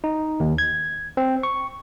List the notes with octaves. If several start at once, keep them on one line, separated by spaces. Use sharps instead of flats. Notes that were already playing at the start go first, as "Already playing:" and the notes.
D#4
D#2
G#6
C4
C#6